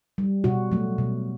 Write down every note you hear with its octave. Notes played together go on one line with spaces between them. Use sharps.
G3
B2 F#4
F#3 A3
B2